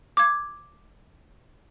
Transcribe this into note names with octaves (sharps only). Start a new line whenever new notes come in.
D6 G#6